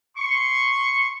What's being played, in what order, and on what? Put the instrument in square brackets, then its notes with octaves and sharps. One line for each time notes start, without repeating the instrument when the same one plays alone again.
[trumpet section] C6 C#6